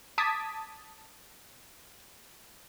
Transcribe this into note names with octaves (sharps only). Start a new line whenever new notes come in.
A5 D6 D#6 G#6 B6